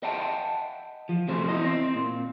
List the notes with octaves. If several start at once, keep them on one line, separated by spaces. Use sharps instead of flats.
D#5 E5 F#5 G5 A5
F3
C3 F#3 A3 C#4 C5
E2 E4 D#5
C4 C5
A#2